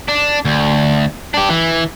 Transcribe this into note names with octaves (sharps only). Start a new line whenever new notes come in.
D4
D2
D4 G4
E3